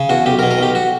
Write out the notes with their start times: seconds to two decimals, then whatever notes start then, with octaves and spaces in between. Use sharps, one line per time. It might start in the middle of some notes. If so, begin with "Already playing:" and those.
Already playing: C#3
0.09 E2 F#4
0.26 B1 G4
0.39 A#4
0.43 B2
0.51 A#4
0.59 B1 G4
0.75 F#4